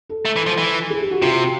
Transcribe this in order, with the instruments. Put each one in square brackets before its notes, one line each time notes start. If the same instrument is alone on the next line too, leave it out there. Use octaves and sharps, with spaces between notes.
[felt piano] A4
[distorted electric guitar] A3
E3
F3
E3
[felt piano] G#4
G4
F#4
[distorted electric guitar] C3 [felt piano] F4